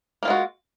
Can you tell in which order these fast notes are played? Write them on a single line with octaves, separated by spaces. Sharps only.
A#3 F4 G#3 F#4